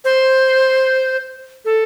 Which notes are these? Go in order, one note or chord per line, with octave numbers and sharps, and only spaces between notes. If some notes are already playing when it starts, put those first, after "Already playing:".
C5
A4